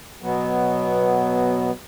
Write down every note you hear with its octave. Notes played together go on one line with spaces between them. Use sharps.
B2 F#3 B3